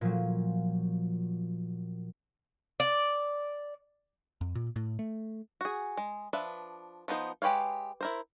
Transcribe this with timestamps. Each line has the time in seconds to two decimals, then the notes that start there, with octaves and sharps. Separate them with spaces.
0.01 A#2 F3 F#3
2.80 D5
4.41 F2
4.55 A#2
4.76 A2
4.99 A3
5.61 F#4 G#4
5.97 G#3
6.33 F3 D4 B4 E5
7.08 F3 B3 D#4 C5
7.42 G#3 G4 B4 C#5 F5
8.01 E4 A#4 C5